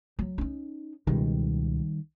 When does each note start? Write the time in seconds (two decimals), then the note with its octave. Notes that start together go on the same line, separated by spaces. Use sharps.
0.19 F#3
0.38 C#4 D#4
1.07 C#2 B2 D#3 G3